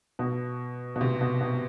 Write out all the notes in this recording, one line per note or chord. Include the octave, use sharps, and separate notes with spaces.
B2
B2
C3
B2
B2